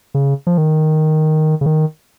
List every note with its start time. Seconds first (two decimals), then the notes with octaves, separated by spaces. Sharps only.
0.14 C#3
0.47 F3
0.58 D#3
1.61 C#3
1.66 D#3